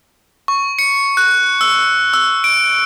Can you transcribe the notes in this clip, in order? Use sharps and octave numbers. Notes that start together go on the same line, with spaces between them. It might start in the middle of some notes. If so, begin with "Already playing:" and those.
C#6
C#7
F#6
E6
E6
D7